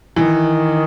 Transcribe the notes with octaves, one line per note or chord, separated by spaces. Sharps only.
D#3 E3